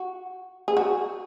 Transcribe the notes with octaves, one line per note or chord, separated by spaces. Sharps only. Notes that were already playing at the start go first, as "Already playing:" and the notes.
Already playing: F#4
G#4
F#4